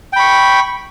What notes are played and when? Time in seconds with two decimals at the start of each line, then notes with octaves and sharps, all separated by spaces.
0.13 G5
0.16 B5
0.19 C#6